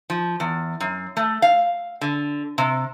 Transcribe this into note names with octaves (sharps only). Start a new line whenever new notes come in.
F3
E2
F#2
A3
F5
D3
C3